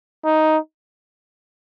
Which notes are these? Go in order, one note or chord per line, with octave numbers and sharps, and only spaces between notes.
D#4